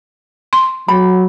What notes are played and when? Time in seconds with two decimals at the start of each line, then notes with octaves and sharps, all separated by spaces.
0.53 C6
0.88 F#3 B5